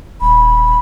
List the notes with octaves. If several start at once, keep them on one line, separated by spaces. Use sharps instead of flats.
D#1 B5